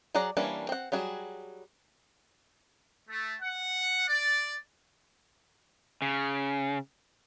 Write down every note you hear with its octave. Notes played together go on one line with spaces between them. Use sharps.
F#3 G#4 D5 F#5 A#5
E3 G3 A#3 C#4 D4
C4 F#5
F#3 G3 F#4 G#4
A3
F#5
D5
C#3